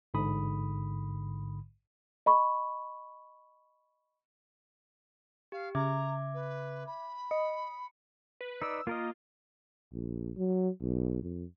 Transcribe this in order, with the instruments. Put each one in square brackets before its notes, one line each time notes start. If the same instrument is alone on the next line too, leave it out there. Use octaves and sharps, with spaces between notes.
[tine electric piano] A1 G#2 D3 B5 D#6
[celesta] D#5 B5 C#6
[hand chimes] G4 [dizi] F5
[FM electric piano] C#3 [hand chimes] E5 D6 G#6 [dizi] A#5
[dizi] B4
B5
[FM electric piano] D#5 [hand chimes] C#7
[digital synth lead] B4
[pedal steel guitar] D#4 B4 D5 [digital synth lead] E6
[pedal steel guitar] A#3 A#4 D#5 [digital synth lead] F4
[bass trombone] A#1
F#3
B1
F2